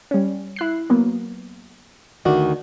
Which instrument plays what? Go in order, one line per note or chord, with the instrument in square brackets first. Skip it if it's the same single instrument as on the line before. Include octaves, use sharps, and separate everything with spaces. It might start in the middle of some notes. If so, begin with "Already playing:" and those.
[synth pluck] G3 C#4
E4 F#6 C7
F#3 A#3 B3
[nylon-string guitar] D2 D#3 F#4 [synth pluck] D5